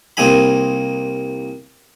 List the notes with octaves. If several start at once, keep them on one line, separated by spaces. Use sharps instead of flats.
C2 A#3 C4 D#4 G#5 B5